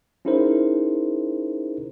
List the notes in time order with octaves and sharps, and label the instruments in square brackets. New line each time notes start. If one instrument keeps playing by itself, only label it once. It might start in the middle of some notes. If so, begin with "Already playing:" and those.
[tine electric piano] C#4 D#4 E4 G#4 A#4 C5